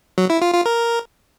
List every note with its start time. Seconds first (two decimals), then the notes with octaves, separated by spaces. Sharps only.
0.18 F#3
0.30 E4
0.42 F4
0.54 F4
0.66 A#4